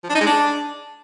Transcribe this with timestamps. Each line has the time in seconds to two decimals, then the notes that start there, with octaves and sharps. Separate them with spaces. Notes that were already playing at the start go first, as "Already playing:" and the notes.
0.04 F3
0.09 D4
0.15 D#4
0.21 G#3
0.26 D4